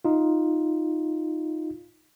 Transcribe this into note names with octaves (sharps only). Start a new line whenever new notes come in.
D#4 F4